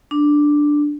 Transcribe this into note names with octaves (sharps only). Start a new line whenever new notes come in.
D4